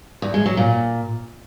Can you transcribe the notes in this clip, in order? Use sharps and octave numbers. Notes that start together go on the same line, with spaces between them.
E2
G#3
F#3
A#2